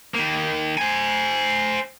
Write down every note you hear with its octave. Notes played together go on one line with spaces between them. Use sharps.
D#3 A#3
C5 G#5